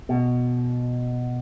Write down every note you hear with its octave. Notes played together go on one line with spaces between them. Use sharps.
B2